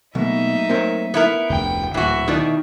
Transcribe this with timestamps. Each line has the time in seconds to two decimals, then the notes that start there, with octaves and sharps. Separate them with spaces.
0.15 B2 F#3 A3 A#3 D#4 E5
0.69 C4 A#4 C#5
1.14 B3 E4 A#4 E5
1.49 F1 D2 C#3 G5
1.94 D1 D2 A#2 E3 F#4 E5
2.28 B2 D#3 D#4 E4 D5